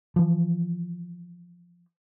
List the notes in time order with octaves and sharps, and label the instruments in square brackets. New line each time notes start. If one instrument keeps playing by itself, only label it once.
[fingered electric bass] E3 F3